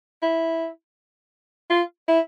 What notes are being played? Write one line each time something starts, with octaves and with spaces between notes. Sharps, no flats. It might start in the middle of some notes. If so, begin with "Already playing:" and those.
E4
F4
E4